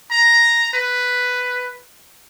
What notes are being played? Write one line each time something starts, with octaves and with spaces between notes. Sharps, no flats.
A#5
B4